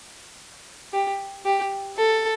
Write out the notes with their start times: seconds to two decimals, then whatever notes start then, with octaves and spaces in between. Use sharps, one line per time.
0.94 G4
1.46 G4
1.97 A4